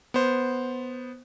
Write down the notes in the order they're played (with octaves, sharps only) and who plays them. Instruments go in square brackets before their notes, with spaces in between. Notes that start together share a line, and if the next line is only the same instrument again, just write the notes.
[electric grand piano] B3 C5